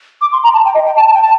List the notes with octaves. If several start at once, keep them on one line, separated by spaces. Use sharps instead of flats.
D6
C6
A#5
A5
G5
D#5
G5
A5
A5
G5
A5